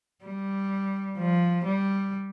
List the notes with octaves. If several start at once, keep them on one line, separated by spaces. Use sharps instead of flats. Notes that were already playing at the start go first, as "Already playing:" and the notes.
G3
F3
G3